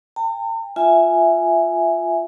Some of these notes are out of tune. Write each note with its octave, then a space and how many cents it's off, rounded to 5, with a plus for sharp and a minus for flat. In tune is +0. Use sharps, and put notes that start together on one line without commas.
G5 +35 A#5 -45
F4 +0 E5 +0 G#5 +0